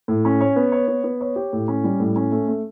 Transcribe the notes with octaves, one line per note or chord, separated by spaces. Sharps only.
A2
C#4
C#5
B3
C#5
B3
B3
C#5
G4
A2
C#4
G3
A2
C#4
A3
A3